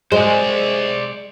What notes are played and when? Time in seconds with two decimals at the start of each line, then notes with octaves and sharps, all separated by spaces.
0.12 G#3 C5 D5